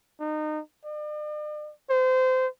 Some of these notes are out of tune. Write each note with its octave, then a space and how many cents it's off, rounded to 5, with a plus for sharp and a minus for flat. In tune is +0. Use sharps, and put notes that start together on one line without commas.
D#4 -25
D5 +45
C5 -25